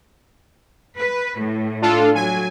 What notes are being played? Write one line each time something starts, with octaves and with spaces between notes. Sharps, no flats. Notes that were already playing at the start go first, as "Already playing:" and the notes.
B4
A2
D4 F4 A4
F#3 G#5